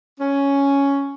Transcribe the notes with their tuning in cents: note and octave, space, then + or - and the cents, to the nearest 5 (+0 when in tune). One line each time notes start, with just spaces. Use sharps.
C#4 +5